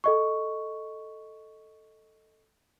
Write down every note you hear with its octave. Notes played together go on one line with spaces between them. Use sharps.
A4 D#5 C#6